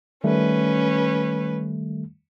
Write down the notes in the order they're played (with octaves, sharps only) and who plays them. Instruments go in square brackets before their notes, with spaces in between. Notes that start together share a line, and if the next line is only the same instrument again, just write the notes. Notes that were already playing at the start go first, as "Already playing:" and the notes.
[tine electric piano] D#3 G3 A3 [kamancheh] C#4 B4